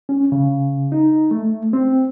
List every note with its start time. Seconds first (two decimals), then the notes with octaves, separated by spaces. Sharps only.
0.09 C#4
0.32 C#3
0.92 D#4
1.31 A3
1.73 C4